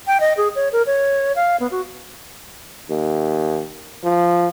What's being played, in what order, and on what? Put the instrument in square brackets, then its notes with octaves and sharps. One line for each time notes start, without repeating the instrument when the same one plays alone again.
[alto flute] G5
D#5
G#4
C#5
A#4
C#5
F5
B3
F#4
[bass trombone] D#2
F3